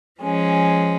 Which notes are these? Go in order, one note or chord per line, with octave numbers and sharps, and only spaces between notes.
F3 G#3 C#4